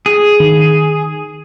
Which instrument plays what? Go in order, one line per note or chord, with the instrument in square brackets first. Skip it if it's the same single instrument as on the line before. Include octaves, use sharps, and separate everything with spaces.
[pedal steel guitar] G#4
[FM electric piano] D#3